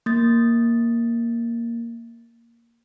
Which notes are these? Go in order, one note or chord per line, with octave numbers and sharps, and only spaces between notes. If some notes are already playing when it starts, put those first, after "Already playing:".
A#3 A6